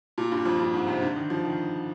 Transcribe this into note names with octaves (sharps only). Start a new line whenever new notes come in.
A#2
G2
F2
G2
G#2
C3
D3
D#3
F3
D#3